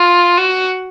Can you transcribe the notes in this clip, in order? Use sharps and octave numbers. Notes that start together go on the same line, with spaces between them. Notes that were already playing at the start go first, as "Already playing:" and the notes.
Already playing: F4
F#4